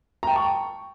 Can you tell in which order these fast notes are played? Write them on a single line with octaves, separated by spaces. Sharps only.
A#5 G5 A5 C#6